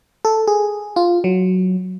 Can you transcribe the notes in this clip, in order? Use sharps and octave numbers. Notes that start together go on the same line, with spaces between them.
A4
G#4
F4
F#3